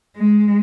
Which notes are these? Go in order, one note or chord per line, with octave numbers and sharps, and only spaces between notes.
G#3